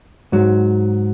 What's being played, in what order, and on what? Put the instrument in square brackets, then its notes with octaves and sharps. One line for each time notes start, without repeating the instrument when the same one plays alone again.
[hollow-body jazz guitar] G#2 F#3